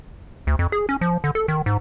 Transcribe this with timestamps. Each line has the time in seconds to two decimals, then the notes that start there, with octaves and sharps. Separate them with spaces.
0.47 D2
0.59 F2
0.72 G#4
0.89 C#4
1.01 F3
1.24 D3
1.35 A4
1.48 D#3
1.66 G#2